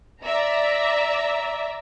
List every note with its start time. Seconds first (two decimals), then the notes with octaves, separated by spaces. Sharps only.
0.24 D5 E5 A#5